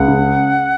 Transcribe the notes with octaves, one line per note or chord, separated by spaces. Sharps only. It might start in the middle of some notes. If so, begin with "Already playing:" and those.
Already playing: C#2 F#5
C#3